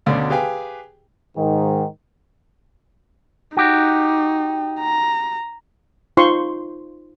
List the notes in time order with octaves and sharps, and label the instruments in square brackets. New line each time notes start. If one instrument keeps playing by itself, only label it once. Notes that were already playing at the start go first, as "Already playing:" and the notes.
[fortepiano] D2 B2 D3 C#4 D5 F5
G4 G#4 B4 F5 G5 G#5
[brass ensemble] G#2 D#3
[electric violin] D#4 [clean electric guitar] F#4 G4
[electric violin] A#5
[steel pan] D#4 F4 C5 C6 C#6